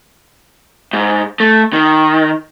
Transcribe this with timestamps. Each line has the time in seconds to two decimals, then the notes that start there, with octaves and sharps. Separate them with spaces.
0.93 G#2
1.40 A3
1.73 D#3